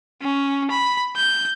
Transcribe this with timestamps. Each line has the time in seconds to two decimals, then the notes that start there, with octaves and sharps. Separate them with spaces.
0.21 C#4
0.71 B5
1.16 G6